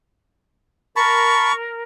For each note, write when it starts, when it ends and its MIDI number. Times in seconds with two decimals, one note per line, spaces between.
0.96 1.83 70
0.96 1.52 81
0.96 1.52 83
0.96 1.54 85